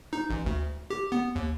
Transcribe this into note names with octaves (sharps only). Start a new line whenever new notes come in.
D#4
A1
D2
G4
B3
D#2